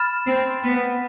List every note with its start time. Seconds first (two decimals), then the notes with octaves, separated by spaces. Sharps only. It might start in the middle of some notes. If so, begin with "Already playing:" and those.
Already playing: B5 F6 A6 E7
0.26 C4
0.63 B3